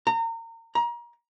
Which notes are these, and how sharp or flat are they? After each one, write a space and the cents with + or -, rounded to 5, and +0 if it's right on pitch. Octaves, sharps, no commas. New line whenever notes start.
A#5 -30
A#5 +30